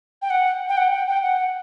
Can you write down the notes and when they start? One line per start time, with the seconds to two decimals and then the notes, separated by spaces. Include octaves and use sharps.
0.22 G5
0.30 F#5
0.69 G5
0.77 F#5
0.92 G5
1.07 G5
1.22 F#5